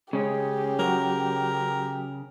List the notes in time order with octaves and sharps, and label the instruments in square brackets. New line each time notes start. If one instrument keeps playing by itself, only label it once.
[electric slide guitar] C#3 C#4 [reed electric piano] G#3 [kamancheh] G4
[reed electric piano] F#3 F#4 [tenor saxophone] A#4